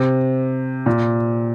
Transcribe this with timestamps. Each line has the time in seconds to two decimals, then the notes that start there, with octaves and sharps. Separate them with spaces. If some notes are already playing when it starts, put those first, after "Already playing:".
Already playing: C3
0.86 A#2